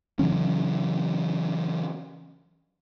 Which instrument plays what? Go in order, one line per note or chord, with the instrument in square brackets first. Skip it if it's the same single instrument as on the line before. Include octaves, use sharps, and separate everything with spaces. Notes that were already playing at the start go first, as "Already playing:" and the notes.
[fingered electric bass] C#3 E3 F#3 C#4